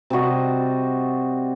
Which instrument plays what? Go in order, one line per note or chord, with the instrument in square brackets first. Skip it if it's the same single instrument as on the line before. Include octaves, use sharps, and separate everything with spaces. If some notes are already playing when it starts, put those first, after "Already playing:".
[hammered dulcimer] C3 G3 F#4 D#5